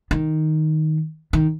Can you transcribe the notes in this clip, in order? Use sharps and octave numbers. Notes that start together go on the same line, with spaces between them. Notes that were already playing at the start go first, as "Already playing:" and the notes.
D#3
D#3